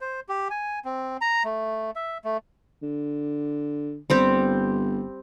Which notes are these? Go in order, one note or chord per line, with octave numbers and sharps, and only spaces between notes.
C5
G4
G#5
C4
A#5
A3
E5
A3
D3
G1 G3 C4 G4